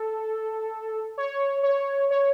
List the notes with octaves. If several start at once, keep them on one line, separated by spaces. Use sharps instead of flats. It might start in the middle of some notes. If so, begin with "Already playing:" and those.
Already playing: A4
C#5
C#5
C#5